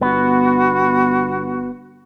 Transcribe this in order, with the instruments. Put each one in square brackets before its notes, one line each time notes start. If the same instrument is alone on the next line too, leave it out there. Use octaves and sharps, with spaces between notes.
[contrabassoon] G1 [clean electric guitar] B3 [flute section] F#4